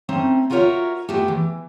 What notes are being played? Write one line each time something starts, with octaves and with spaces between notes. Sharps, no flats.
A3 C4 C#4 D#4
D#4 F4 F#4 A#4 C#5 E5
G#3 A3 B3 E4 G4
E3